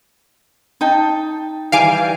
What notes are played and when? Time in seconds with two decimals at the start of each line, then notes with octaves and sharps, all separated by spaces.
0.81 D#4 G5 A5
1.72 E3 G3 F5 G#5 C7 D7